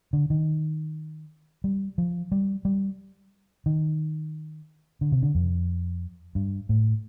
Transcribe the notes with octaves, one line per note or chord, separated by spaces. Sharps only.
D3
D#3
G3
F3
G3
G3
D#3
D3
C3
D3
F2
G2
A2